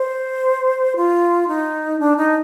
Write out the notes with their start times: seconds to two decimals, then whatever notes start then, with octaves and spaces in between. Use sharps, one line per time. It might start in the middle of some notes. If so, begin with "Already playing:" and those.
Already playing: C5
0.96 F4
1.48 D#4
1.99 D4
2.17 D#4